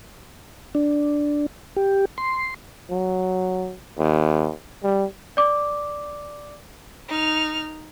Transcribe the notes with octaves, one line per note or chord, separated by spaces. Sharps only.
D4
G4
C6
F#3
D#2
G3
D5 D6
D#4 F6